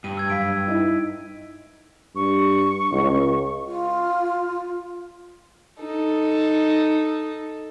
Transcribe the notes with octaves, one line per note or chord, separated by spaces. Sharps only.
G2 D#7
E6 G#6
F#2 F5 G#6 B6 D7
D#4 E4 D#5
G2 C#6
C#2
F4
D#4 A4